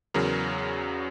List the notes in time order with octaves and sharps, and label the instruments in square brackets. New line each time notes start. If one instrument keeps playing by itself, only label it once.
[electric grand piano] E2 C#3 F#3 A#4